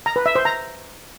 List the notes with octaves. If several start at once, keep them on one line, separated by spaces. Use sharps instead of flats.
A#5
B4
E5
C5
A#5